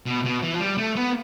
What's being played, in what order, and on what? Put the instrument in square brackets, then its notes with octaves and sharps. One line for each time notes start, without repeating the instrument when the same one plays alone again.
[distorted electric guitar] B2
B2
E3
F3
G3
A3
B3